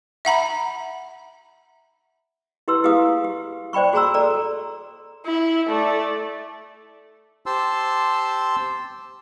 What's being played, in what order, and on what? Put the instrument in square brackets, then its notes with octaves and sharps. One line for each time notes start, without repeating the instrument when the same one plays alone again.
[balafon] E5 F#5 A#5 B5
[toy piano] E4 G4 B4 C6 E6
E4 G4 G#4 B4 F5 D#6
G4
C5 D5 G5 B5 C#6
F#4 G#4 G#5 A#5 C6 E6
A4 D5 A#5
[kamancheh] E4
A3 D5
[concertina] G4 C5 A5 C6 E6